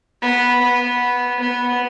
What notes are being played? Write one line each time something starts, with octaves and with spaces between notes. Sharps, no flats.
B3
B3
B3